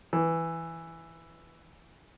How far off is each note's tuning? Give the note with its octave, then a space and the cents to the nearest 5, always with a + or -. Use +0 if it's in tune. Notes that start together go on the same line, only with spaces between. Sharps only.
E3 +0